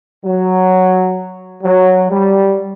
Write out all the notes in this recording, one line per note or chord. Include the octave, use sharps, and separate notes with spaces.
F#3
F#3
G3